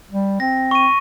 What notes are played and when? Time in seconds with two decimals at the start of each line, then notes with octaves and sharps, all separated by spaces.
0.11 G3
0.40 C4 A#6
0.71 C#6 D#7